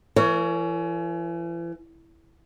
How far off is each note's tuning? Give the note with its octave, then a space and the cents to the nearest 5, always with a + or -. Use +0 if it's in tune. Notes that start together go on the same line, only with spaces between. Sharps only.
E3 +40 A#4 -30 C#5 +20